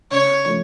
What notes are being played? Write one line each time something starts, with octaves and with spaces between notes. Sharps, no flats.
C#3 C#5
F3 A3